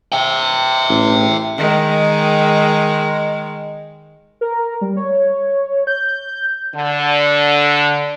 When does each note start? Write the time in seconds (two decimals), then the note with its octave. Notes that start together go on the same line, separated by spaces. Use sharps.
0.12 E5 G5
0.89 A1
1.57 D#3 G#3
4.41 A#4
4.81 G3
4.97 C#5
5.87 G6
6.75 D3